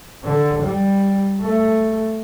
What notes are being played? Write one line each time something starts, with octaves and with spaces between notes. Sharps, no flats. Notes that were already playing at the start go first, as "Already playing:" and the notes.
D3
G3
A3